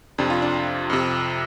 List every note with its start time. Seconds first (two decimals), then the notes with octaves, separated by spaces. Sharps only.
0.18 F2 C3 D4
0.30 F4
0.42 D4
0.90 F2 C3